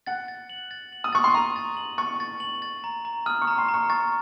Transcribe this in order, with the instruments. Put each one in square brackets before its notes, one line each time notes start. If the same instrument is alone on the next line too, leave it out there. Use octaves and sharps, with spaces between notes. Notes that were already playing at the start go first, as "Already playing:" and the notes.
[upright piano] F#5 [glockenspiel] A6
[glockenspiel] A6
F#7
A6
F#7
[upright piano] D#6
[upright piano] C#6 [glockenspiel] A6
[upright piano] C6
[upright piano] A#5 [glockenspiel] D#7
[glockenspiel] A6
F#7
[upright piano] C#6 [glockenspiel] A6
[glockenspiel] A6
F#7
A6
A#5
A#5
[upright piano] D#6 [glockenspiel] F6
[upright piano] C#6
[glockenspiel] A#5
[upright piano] C6
[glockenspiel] A#5
[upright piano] C#6
[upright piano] C#6 [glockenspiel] A6